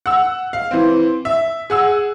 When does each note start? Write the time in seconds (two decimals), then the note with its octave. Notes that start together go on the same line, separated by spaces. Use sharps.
0.06 F#5 E6
0.53 F5
0.71 E3 C4
1.25 E5
1.70 G#4 F#5 E6